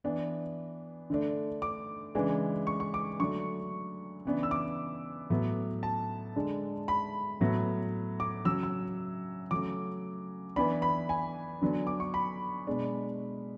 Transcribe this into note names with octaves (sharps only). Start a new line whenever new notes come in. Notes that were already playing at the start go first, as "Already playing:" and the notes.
E3 B3 D4
D3 A3 D4
D6
C#3 E3 G#3 D4
C#6
C#6
D6
D3 F#3 A3 D4 C#6
C#3 E3 B3 D4
E6
D6
A2 F#3 B3
A5
D3 G#3 D4
B5
A2 F#3 B3
D6
C#3 F#3 C#4 E6
E6
C#3 F#3 A3 C#4 D6
E3 B3 D4 B5
B5
G#5
D3 F#3 B3 D4
D6
C#6
B5
B2 G#3 D4